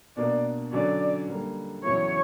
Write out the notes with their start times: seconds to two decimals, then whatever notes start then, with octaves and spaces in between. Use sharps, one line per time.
0.17 B2 A#3 D4 D5
0.72 D3 F#3 C#4 D5
1.28 D3 G3 A#3
1.84 E2 C#3 F#3 B3 E4 C#5